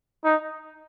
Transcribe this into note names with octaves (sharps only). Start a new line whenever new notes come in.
D#4